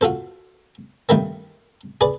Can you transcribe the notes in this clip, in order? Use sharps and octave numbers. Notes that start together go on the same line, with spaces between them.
F4 F#4 A4 C5
G2 D#3 A3 A#3 C4
G#4 B4 D5